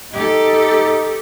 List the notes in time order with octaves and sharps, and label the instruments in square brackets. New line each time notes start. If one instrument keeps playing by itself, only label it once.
[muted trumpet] D#4 [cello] G4 A4